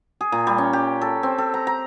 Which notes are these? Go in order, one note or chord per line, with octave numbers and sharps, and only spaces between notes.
G#4
A#2
G3
C#4
G4
A4
C4
A4
A#5
A#5